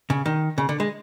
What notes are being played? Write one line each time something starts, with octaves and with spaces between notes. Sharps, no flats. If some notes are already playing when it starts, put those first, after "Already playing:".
C#3
D#3
C#3
D3
G#3